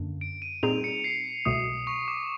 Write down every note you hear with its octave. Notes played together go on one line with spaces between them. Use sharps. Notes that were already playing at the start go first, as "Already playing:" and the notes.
Already playing: F#2 D3 A#3 D4
D7
D#7
A#2 G3 C4 D#4 G#4 F7
C#7
C7
C2 B2 F#3 A3 D#6
C#6
D6